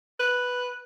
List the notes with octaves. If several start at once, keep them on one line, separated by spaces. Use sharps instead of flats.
B4